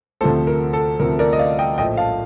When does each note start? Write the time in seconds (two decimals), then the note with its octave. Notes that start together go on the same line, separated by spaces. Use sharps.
0.21 D2 C3 F3 A3 A4 C5
0.47 A#4
0.73 A4
1.00 D2 C3 F3 A3 A#4
1.19 A#4 D5
1.33 D#5
1.39 D5 F5
1.59 D#5 G5
1.78 A#1 A2 F3 A3 D#5 G5
1.97 F5 A5